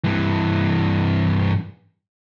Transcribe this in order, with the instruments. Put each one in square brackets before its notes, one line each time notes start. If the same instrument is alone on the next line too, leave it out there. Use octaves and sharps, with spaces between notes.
[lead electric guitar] G2 E3